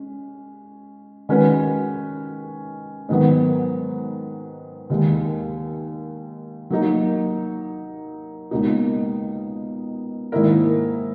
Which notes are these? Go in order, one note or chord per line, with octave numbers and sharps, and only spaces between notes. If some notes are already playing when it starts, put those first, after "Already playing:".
Already playing: G#3 C#4
D#3 G#3 C#4 F#4 B4
G#2 D#3 F#3 B3
D#2 D#3 G#3
F#3 A#3 D#4
C#2 B2 A#3 D#4
G#2 D#3 A#3 E4 A#4